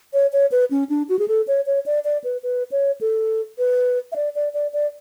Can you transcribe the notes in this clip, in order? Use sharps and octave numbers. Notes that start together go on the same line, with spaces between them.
C#5
C#5
B4
C#4
D4
F#4
G#4
A4
C#5
C#5
D5
D5
B4
B4
C#5
A4
B4
E5
D5
D5
D5
D5